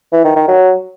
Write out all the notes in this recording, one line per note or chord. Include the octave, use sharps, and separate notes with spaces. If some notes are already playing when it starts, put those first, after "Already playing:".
E3
D#3
D#3
F#3